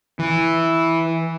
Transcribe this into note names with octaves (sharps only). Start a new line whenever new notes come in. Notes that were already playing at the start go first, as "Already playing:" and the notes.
E3